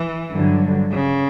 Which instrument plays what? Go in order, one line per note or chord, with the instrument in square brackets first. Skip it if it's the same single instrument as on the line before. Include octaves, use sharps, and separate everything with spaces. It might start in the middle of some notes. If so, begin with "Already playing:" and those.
Already playing: [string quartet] E3
[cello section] G2 D3 F#3
[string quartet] C#3